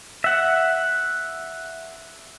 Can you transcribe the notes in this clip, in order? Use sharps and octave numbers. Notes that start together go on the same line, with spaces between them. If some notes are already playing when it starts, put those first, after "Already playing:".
E5 F#5